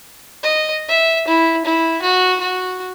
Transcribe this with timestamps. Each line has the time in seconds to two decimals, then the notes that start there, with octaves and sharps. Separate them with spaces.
0.43 D#5
0.88 E5
1.28 E4
1.65 E4
2.02 F#4
2.40 F#4